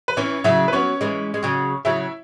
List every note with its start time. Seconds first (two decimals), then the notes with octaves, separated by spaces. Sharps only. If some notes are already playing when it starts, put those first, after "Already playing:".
0.08 B4
0.17 E3 C#4 C#5
0.44 C#3 F#3 E4 E5
0.68 B4
0.72 F#3 B3 C#4 C#5
1.01 E3 G#3
1.34 G#3
1.43 C#3 F#3
1.85 C#3 F#3 E4 E5